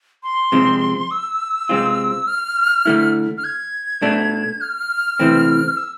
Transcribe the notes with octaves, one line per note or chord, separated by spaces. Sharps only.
C6
C3 F3 G#3 C4
E6
C3 G#3 C4 F4
F6
D3 A3 E4
F6
G#6
B2 A3 D4
F6
C3 E3 A3 C4
E6